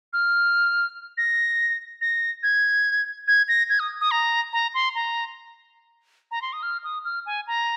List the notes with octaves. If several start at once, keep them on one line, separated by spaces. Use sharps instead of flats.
F6
A#6
A#6
G#6
G#6
A#6
G#6
D#6
D#6
A#5
A#5
C6
A#5
A#5
C6
D#6
F6
D#6
F6
G#5
A#5